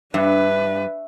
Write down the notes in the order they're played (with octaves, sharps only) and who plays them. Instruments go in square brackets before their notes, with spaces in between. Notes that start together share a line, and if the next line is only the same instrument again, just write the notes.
[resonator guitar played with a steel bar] G2 [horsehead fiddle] D4 B4 [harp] E5 F#6